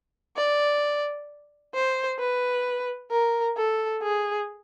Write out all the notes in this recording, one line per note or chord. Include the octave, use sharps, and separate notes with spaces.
D5
C5
B4
A#4
A4
G#4